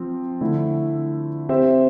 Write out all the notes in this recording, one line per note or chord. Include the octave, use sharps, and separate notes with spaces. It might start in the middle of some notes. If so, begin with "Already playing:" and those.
Already playing: F3 C4 F4
D3 A3 E4
C4 G4 C5 E5